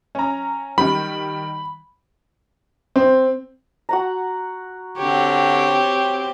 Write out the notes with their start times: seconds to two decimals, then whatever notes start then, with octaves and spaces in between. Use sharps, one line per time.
0.15 C#4 A#5
0.78 D#3 G3 B5
2.96 C4
3.89 F#4 F#5 A#5
4.98 D3 C4 G4 C#5